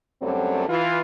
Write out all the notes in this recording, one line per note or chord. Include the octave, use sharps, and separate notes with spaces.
F#2 D3 F#3 G3 A3 C4
E3 F4